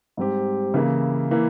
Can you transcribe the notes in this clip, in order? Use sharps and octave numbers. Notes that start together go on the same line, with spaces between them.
G#2 G3 C4 G4
C#3 E3 A#3 E4
E3 A#3 E4